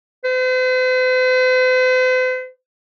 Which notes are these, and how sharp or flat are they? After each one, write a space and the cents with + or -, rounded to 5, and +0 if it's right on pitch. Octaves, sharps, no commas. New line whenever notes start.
C5 -45